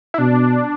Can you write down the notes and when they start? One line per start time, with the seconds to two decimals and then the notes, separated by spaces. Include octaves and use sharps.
0.14 E4
0.18 B2 D4